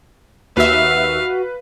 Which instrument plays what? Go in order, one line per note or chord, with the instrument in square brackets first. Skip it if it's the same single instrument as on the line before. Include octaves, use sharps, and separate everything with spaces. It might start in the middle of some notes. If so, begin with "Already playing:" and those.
[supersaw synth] D#2 E5 [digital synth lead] F#4 [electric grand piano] B4 [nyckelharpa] F5